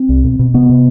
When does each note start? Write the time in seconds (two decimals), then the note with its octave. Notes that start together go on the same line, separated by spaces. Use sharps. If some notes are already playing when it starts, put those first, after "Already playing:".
Already playing: C4
0.09 C2
0.24 B2
0.39 B2
0.54 C3 B3
0.69 C3